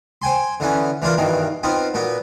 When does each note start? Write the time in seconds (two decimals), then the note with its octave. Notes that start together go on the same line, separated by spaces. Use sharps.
0.22 C5 G5 G#5 C6
0.60 D3 E3 B3 C#4
1.02 E3 D4 F4 A#4
1.17 G2 B2 D#3 E3
1.63 B3 C4 D#4 F4
1.94 A#2 B3 F#4